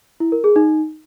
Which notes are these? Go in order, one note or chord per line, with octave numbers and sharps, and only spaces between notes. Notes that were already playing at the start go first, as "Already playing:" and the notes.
E4
A#4
G#4
D#4